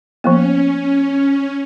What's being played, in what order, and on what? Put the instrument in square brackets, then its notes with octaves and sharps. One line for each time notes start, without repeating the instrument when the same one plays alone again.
[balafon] F3 A#3 B3 [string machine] C#4